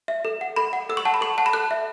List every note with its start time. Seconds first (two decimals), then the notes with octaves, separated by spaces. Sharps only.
0.08 E5
0.25 A4
0.41 F#5
0.56 A4 B5
0.73 F#5
0.89 A4 E6
0.97 C#6
1.05 F#5 A5
1.14 B5
1.21 A4 C#6
1.38 F#5 A5
1.46 B5
1.53 A4 F#6
1.71 E5